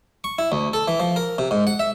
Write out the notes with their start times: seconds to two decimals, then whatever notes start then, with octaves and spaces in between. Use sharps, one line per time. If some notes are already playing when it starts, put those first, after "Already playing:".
0.24 C#6
0.39 E4
0.52 D2
0.73 A4
0.88 E3
1.00 F3
1.16 A#4
1.38 C3
1.51 G#2
1.67 F#5
1.80 E5